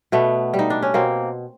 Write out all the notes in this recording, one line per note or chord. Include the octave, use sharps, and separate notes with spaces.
B2 A3 B3
G3
D#4
D4
C#4
B2 A#3 C4